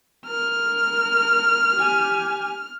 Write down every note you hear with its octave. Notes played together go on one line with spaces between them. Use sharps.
A#4 F6
G4 G#5